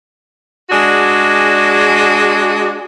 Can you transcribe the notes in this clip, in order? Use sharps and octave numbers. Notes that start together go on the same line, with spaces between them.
G#3 D4 F#4 G#4